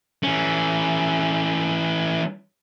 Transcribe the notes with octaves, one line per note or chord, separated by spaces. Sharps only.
E3 C#4